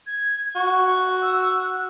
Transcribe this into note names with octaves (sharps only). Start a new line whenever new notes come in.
G#6
F#4 C#6
E6
F#6